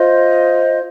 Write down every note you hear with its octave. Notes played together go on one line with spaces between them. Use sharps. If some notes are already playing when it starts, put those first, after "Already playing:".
Already playing: F4 C5 D#5